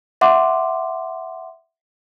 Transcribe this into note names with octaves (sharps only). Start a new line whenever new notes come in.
E5 F#5 C6 D6